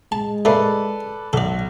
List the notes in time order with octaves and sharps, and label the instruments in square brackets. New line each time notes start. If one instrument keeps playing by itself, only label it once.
[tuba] G#3 [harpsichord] A5
[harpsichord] A3 A#3 [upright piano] A4 B4 D5
[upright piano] B1 [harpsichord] A4 D5